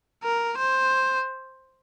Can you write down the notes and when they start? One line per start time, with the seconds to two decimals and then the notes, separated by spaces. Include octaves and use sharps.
0.24 A#4
0.58 C5